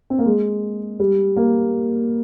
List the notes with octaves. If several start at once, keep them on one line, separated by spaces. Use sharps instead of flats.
C4
A#3
G#3
G3
A#3